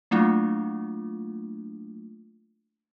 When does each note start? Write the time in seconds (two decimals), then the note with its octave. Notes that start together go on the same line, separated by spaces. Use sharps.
0.11 F#3 A3 A#3 D4 E4 F4